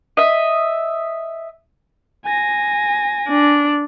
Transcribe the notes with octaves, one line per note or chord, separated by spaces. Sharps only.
D#5 E5
G#5 A#6
D4